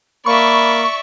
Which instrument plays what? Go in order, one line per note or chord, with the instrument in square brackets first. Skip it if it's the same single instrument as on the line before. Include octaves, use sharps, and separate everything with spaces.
[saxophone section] A#3 [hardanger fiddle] D5 E5 [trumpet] B5 [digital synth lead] C#6